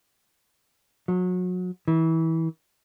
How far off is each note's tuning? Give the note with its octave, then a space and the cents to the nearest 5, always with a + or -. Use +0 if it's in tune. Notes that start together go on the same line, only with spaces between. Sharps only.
F#3 -30
E3 -25